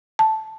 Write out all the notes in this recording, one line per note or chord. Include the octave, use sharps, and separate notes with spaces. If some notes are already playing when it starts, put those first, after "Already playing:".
A5